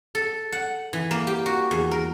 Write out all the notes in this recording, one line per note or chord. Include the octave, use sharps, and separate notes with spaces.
A4
F#5
E3
A#3
G4
F#4
E2
A#4